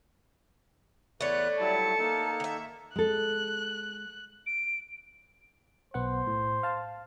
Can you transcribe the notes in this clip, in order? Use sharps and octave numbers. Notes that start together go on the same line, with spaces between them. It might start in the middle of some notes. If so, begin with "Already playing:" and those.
E2 A3 B4 C#5 D5 F#6
F#3 G3 E4 A5 C#7
A#3 D#4 A4
D#3 E5
G#3 A4 F#6
D7
B1 B3 C5 F#5
A2
F5 A5